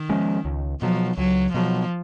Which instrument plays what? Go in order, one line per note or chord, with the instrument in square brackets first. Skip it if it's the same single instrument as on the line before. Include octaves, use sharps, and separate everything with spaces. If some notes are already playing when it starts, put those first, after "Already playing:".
Already playing: [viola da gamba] D#3
[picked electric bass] F3 G#3 C#4
C#2
[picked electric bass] B2 F#3 [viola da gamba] F3
[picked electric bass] C#2 [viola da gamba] F#3
[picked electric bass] B2 F#3 [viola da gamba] F3